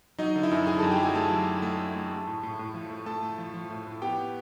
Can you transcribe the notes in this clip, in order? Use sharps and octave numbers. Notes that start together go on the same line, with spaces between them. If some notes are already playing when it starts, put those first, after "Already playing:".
F#3 D#4 D#5
D3
E4 E5
F#2
D3 G#4 G#5
A4 A5
F#2
G4 G5
F#3 G#4 G#5
A3 A4 A5
F#3
A3
A3
A3
A3
A3
A2
A2
A2
F3
A3
A2 A4 A5
A3
F3
F3
A2
A2
B3 G4 G5
B3